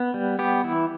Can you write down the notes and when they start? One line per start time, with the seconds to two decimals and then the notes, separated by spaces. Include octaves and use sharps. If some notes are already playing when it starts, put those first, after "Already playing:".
Already playing: B3
0.14 G3
0.39 B3 G4
0.64 E3 E4